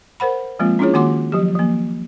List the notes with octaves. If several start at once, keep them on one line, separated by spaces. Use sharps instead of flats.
A#4 C5 F#5 B5
F3 G#3 A#3 C4 F4
C#4 D4 E4 F4 G#4 C#5
D#3 A#3 F#4 F#5 C6 D6
F3 F#3 G4
F3 A#3